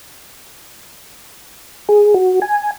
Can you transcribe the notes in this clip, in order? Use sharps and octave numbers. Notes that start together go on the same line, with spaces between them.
G#4
F#4
G#5